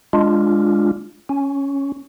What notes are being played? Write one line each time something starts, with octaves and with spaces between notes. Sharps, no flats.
G#3 D4 F4
C#4